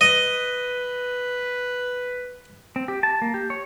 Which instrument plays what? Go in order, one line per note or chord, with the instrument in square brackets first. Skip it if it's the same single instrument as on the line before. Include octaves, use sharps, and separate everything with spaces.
[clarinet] B4 [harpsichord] D#5
[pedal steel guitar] C4
G4
A5
A#3
G4
C#5